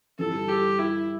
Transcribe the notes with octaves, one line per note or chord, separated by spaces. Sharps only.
G1 G2 E3 G3 A4
G4
E4